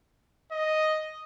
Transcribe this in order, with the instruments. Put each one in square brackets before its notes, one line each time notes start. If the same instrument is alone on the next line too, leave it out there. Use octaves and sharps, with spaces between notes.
[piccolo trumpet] D#5